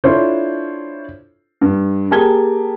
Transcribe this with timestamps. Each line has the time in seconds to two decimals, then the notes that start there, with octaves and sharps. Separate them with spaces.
0.04 D4 E4 F4 A4 C5 C#5
1.61 G2
2.11 A#3 G4 G#4 A5 G#6 G7